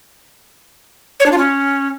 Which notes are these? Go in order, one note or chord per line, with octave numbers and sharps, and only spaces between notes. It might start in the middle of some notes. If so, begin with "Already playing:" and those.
C#5
D4
F4
C#4